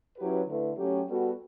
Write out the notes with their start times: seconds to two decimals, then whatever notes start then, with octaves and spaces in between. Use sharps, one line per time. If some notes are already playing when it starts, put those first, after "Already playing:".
0.18 F#3 C#4 E4 G4 B4
0.47 D3 A3 E4 B4
0.76 F#3 A3 C#4 G4
1.07 G3 B3 F#4 A4